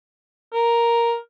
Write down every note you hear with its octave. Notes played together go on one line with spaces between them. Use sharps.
A#4